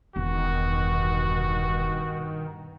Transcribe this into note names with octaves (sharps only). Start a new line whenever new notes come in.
E1 E2 G2 B2 D#3 F#4